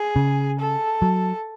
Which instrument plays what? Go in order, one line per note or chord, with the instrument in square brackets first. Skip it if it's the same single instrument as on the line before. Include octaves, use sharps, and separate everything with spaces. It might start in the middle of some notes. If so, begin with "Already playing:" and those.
Already playing: [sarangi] G#4
[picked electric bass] C#3
[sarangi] A4
[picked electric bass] F#3